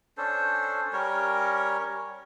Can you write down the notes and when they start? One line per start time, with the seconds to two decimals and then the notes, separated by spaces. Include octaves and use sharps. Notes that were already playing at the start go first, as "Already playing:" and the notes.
0.17 C#4 D4 A4 C5
0.93 G3 C#4 A#4 C#5